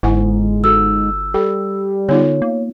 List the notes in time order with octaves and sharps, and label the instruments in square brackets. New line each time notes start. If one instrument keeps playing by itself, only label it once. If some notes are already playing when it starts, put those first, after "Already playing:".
[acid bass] G1 [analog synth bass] G#2 [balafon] E4 F#5 G#5
[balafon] F#4 A4 [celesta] E6
[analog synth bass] G3 [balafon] A4
[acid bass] D3 [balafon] B3 D#4 F4 [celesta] C#5
[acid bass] A#3